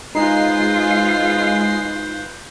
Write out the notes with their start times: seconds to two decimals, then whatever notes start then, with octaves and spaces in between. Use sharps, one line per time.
0.15 G#3 D#4 F4 B4 C5 C7